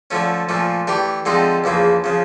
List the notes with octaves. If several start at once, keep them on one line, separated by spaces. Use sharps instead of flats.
D3 F3 A3 C#4
A#2 F3 A3
E3 A3 D4 G4
D3 F3 G#3 C4 D#4
E2 C#3 F3 A#3
C#3 F3